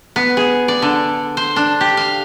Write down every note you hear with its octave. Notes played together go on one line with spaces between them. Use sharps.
B3
G#4
D5
D3
C5
D4
G4
F5